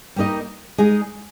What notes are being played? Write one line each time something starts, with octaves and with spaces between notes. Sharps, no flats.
G3 A#3 D#4 A#4 D#5
G#3 D#4 G#4 D#5